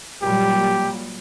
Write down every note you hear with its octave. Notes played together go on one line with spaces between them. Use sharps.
A#2 F#3 G3 G4